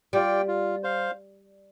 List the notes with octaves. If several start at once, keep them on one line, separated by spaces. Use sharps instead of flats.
G3 F4 D5 G5
F4
C5 F5